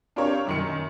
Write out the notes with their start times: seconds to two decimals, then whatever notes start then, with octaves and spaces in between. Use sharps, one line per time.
0.16 C4 D4 F4 G4 A#4 C#5
0.46 F#2 D#3 C#7